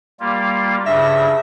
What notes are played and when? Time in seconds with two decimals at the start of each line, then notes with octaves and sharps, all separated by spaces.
0.20 G3 A#3 F4
0.86 G2 C#3 E5 A#6